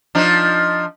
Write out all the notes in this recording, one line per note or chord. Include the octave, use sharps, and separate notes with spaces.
F3 D4 D#4